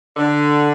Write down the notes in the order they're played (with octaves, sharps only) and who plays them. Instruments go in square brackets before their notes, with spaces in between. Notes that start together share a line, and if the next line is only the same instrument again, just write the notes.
[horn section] D3